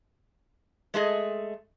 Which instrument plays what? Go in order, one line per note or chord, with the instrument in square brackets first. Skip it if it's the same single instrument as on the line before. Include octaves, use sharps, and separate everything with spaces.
[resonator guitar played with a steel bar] G#3 A3 G#4 D#5